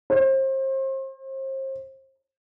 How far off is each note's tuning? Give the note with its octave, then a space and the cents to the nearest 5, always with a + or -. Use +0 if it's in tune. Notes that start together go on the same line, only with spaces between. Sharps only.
C5 +35